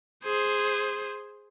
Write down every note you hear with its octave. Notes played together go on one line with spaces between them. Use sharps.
G#4 C5